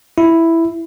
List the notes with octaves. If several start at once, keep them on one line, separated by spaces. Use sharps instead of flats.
E4